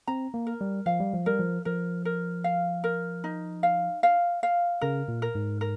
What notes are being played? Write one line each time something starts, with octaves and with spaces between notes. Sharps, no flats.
C4 A#5
A#3
A#4
G3
F3 F5
G3
F3
G3 A#4
F3
F3 A#4
A#4
F5
A#4
D#4
F5
F5
F5
C#3 A#4
A#2
A#4
G#2
A#4